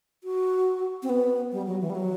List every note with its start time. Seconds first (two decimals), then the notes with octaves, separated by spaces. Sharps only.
0.24 F#4
1.03 C4
1.09 B3
1.52 G3
1.66 F#3
1.81 E3
1.90 G3
1.95 F#3